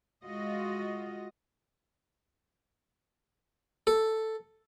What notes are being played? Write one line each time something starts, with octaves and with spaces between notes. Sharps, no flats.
G#3 F4 F#4 D#5
A4